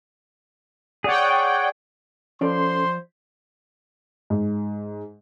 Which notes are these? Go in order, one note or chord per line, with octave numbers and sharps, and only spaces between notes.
G#4 C#5 D5 F#5 G5
F3 C#4 A4 C5 D5 C6
G#2